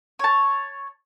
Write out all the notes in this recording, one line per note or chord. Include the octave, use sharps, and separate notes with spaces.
C#5 A5